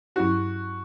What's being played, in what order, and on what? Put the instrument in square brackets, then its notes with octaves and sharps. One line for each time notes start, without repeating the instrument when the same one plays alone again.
[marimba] G2 F#3 C#4 E4 G4 [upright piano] F#4